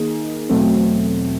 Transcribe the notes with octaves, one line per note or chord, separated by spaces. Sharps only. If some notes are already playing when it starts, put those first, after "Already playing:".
Already playing: D#3 A#3 D#4 G#4
E2 B2 F#3 A3 C4